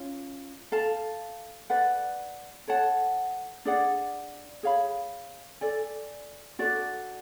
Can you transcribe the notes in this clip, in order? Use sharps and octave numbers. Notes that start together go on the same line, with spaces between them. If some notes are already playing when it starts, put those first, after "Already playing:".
Already playing: C#4 F4
A4 F5 A5
B4 D5 F#5
A4 C#5 F#5 A5
D4 G#4 D5 F#5
G#4 C#5 F5 B5
A4 D5 G#5
D4 F#4 A4 D5